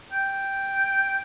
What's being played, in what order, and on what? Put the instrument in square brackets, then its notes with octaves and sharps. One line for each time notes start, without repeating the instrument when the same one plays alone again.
[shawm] G5